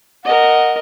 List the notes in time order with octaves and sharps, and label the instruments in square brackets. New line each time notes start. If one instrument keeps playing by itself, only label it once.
[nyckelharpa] A#4 D#5 [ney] F#5